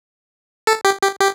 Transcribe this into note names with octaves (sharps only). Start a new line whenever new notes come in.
A4
G4
G4
G4